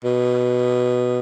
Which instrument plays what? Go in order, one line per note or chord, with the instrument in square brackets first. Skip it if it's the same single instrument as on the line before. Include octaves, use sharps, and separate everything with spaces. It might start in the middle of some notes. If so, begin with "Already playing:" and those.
[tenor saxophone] B2